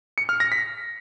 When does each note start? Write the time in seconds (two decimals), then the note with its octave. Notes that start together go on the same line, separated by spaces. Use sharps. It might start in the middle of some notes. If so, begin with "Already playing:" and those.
0.18 C#7
0.29 F6
0.40 A#6
0.52 B6